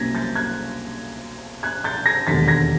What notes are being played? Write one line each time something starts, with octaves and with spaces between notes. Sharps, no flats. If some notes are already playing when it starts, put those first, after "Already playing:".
Already playing: C2 B2 F#3 A#3 C#4 G#6 A#6 B6
G6 A6
F#6 G#6
F#6 G#6
G6 A6
G#6 A#6
E1 D#2 D3 A6 B6
G#6 A#6